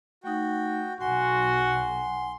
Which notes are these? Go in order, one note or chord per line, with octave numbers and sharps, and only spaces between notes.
A3 D#4 F#4 G5
B1 F#4 F#5 G#5 C6